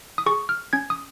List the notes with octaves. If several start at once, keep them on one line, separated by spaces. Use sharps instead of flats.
D#6
G#4 C#6
F6
C#4 G#6
D#6